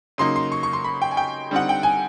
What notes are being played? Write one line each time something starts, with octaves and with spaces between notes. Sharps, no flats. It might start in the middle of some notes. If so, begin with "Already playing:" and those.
C#3 F#3 A#3 D#4 C6
C6
C#6
C#6
C6
B5
G5
G#5
G5
D3 G3 C4 D#4 F#5
G5
G#5